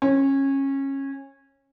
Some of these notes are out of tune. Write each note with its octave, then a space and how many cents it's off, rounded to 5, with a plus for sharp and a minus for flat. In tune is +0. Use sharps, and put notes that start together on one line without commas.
C#4 -20